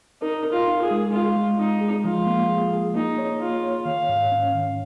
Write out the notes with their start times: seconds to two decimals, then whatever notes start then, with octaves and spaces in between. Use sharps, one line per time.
0.22 D#4 A#4
0.45 A#4
0.52 F4
0.68 D#4
0.82 G#4
0.91 G#3
1.13 G#3 F4
1.36 G#3
1.58 G#3 D#4
1.81 G#4
2.04 F3 F4
2.27 A#3
2.49 G#4
2.73 G#4
2.95 A#3 D#4
3.18 C#5
3.40 A#3 F4
3.63 C#5
3.85 D#3 F5
4.09 G#2
4.32 C#4
4.54 D#3